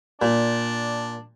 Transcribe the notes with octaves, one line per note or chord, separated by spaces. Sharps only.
A#2 D4